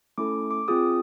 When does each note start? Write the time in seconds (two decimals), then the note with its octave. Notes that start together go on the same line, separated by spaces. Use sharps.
0.18 A3 C#4 E4 A4 D6
0.51 D6
0.68 C4 F4 G#4 D#6